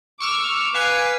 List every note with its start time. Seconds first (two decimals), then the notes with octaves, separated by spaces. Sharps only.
0.20 C#6 D6 E6 F6
0.74 B4 F5 G#5 C#7